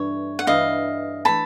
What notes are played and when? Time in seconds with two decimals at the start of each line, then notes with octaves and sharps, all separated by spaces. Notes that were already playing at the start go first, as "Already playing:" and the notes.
Already playing: G2 E3 A3 C#5
0.39 F#5
0.47 G2 E3 A3 D#5 F5
1.25 E3 A3 A5 B5